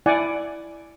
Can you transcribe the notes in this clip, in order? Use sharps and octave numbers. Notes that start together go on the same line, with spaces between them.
E4 D5 F#5 G#5